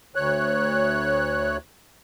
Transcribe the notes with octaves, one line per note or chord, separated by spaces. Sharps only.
D2 C#5 F#6